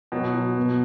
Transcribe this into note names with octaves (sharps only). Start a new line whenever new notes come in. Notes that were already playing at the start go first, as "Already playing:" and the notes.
B2 F#3
F#3
B2